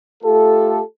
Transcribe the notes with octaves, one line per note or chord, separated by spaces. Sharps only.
A3 F4 G4 A4